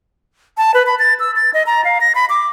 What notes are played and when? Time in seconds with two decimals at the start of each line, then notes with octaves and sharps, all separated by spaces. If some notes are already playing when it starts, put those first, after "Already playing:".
0.58 A5
0.74 B4
0.86 B5
0.99 A6
1.20 E6
1.36 A6
1.54 D#5
1.66 A#5
1.84 F5
2.01 A#6
2.15 B5
2.30 D6